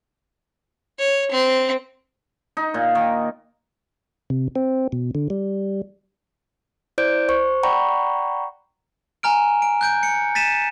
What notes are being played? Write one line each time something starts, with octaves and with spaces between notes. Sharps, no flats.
C#5
C4
D#4
A#2
D#3
C3
C4
B2
D3
G3
E4 C5 D5 G6 D7
C5 C#6
D5 F#5 G5 A#5 B5 C#6
G#5 A#5 F6 D7
D7
F#6 G6 D7
C#7
A6 B6 D#7 E7